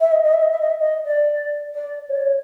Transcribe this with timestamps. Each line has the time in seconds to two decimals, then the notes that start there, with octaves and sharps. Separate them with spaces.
0.01 E5
0.12 D#5
0.24 D#5
0.33 E5
0.42 D#5
0.51 E5
0.61 D#5
0.70 E5
0.80 D#5
1.05 D5
1.75 D5
2.09 C#5
2.15 D5
2.21 C#5